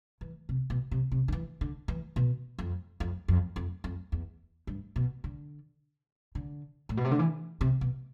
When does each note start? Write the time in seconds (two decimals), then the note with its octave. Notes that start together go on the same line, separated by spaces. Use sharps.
0.21 E3
0.49 C3
0.70 B2
0.91 C3
1.12 C3
1.28 D3
1.32 E3
1.61 D3
1.88 E3
2.16 B2
2.58 F2
3.00 F2
3.28 F2
3.56 F2
3.84 F2
4.12 E2
4.67 G2
4.96 B2
5.24 D3
6.35 D3
6.89 A2
6.97 B2
7.04 C3
7.11 D3
7.19 E3
7.61 C3
7.81 B2